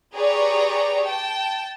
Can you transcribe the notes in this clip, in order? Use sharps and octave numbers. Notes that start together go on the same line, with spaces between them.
G4 G#4 B4 C#5 D5 A#5
G5 A5